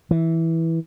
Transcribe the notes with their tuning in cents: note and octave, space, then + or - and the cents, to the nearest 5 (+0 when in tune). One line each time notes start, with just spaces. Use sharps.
E3 -10